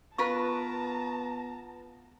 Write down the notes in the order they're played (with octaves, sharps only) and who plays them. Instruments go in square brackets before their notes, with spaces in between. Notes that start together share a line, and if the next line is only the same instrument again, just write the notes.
[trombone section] B3 [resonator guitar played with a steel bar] F4 A#4 B4 [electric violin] A5 A#5 [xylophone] C#6